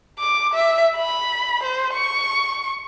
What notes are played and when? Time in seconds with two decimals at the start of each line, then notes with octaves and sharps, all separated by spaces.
0.19 D6
0.54 E5
0.97 B5
1.63 C5
1.94 C#6